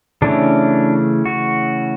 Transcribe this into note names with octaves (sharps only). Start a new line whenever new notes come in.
C#3 E3 A3 C#4 D4
F#4